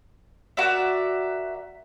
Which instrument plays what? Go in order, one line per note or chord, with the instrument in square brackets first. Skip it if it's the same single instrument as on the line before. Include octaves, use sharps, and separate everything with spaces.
[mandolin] F#4 A#4 D5 E5